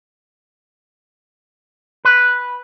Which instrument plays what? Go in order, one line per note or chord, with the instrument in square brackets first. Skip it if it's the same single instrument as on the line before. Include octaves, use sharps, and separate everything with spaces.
[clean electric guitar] B4